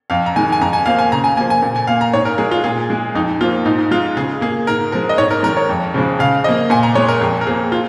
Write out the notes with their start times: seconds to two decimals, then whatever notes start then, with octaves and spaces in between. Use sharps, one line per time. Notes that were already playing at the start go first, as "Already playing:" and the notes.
0.10 F2 F5
0.26 A#5
0.36 D#3 G#3 G#5
0.52 G#5
0.61 F2 A#5
0.73 G#5
0.86 F3 A#3 F5
0.99 G#5
1.12 C#3 A#5
1.24 G#5
1.37 A#3 G#5
1.40 F3
1.50 G#5
1.62 A#2
1.76 G#5
1.87 A#3 F5
2.01 A#5
2.13 G#2 C#5
2.25 A#4
2.38 G#3 G#4
2.51 F4
2.64 A#2 G#4
2.90 G#3
3.15 F2 D#4
3.41 F3 A#3 F4
3.66 G#2 D#4
3.91 G#3 F4
4.17 C#3 G#4
4.41 A#3 G#4
4.67 G#2 A#4
4.92 F3 G#3 A#4
5.09 D#5
5.18 G#2 C#5
5.31 A#4
5.43 D#3 G#3 A#4
5.57 C#5
5.69 F2
5.94 C#3 F3 G#3
6.19 C#3 F5
6.44 F3 A#3 D#5
6.70 A#2 G#5
6.83 A#5
6.95 G#3 C#5
7.08 A#4
7.21 F2 G#4
7.41 A#4
7.46 F3 A#3 G#4
7.72 F4